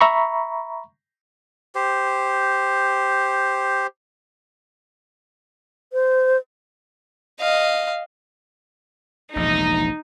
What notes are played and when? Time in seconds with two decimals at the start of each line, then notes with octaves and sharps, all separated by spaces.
0.01 E5 A#5 B5 C#6
1.75 G4 C5
5.93 C5
7.40 D#5 F5
9.36 E1 A#1 C3 D#4